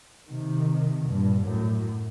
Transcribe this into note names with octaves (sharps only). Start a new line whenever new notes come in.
C3 D#3
G2 A#2
F#2 A2